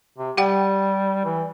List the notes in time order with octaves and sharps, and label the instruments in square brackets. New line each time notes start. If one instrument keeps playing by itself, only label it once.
[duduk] C3
[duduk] G3 [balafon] G4 F#5 G5
[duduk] E3